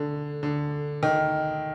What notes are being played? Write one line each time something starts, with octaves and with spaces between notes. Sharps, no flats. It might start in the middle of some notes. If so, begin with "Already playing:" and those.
Already playing: D3
D3
D#3